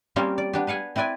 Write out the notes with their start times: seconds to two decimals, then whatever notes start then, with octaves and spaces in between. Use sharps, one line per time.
0.16 G3 A#3 C4 C#4 F4 G4
0.38 D5
0.53 B3 D4 G4
0.67 B4 F5 F#5 G#5
0.96 C4 E4 B4 D5 G#5